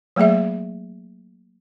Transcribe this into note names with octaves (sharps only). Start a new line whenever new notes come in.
F#3 A3 A#3 G#4 E5